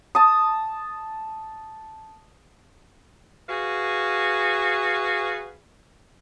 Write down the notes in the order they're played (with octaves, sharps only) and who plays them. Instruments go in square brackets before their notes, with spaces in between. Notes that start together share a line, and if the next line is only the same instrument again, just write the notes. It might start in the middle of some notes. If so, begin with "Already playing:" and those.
[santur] A5 D#6
[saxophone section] F#4 G#4 B4 F5